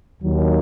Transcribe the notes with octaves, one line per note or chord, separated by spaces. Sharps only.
D#2 D#3 F#3